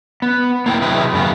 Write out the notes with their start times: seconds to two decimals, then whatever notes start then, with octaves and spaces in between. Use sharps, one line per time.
0.22 B3
0.66 A#3 E4 G5
0.81 C3 F#3 G#3 E4 B4
1.13 F#2 C#3 B3